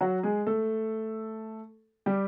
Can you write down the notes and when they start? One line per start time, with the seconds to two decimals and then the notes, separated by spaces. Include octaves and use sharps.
0.01 F#3 F#4
0.23 G#3 G#4
0.47 A3 A4
2.06 G3 G4